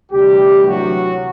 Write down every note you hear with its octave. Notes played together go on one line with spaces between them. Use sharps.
D2 C3 E3 G3 G4
F#3 F#4